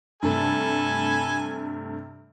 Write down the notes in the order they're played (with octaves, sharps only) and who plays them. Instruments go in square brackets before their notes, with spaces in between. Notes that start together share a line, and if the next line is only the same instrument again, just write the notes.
[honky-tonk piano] G2 C3 A3 [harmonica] A4 G#5 B5